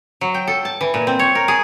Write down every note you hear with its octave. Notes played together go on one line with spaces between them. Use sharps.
F#3
G5
A4
A5
E3
A#2
C4
C#5
A#4
G#4